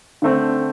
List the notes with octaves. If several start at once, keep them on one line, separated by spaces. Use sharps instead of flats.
D3 A3 C4